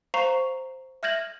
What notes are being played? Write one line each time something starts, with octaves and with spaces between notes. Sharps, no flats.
C5 F5 A#5 C#6 C7 F7
E5 F6 G6 G#6 A#6 F#7